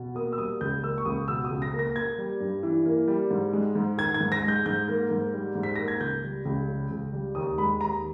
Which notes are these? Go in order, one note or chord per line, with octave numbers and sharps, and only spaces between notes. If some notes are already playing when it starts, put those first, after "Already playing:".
Already playing: B2
A#3 D#6
E6
G3 D#6
C#2 G6
A#3 E6
C#6
C#2 D#6
B2 E6
D#6
C#2
A#6
A#3
A#6
A#3 G#6
G3
G2
E3
A#3
G3
G#2
G#3
G#2
D#3 G#6
G#6
G#2
A#6
G#3
G6
G#2 G6
A#3
G#2
G3
G#2
B6
A#3 A#6
G#6
C#2 G6
G3
C#2
C#3
C#2
G3
D#2 D#6
G#3 B5
D#2 A#5